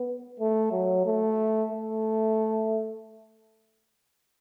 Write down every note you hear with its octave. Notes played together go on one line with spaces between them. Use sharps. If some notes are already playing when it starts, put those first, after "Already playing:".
Already playing: B3
A3
F#3
A3
A3